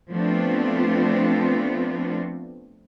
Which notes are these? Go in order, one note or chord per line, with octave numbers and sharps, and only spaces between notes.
F3 A3 B3 C4 D4 F4